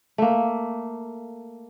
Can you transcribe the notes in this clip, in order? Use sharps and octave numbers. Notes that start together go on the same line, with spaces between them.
A3 A#3